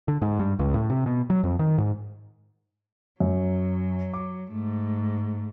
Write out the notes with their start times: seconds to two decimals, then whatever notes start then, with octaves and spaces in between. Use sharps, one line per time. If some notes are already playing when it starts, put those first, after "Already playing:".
0.08 D3
0.22 G#2
0.39 G2
0.59 C#2
0.74 A2
0.90 C3
1.06 B2
1.30 F#3
1.43 F2
1.59 D#3
1.78 G#2
3.20 F#2 F#3
4.14 D6
4.51 G#2 A3